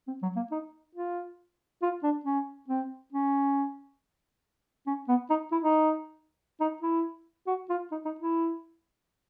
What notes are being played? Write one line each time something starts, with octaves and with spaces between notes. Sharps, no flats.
C4
F#3
A#3
D#4
F4
F4
D4
C#4
C4
C#4
C#4
B3
D#4
E4
D#4
D#4
E4
F#4
F4
D#4
D#4
E4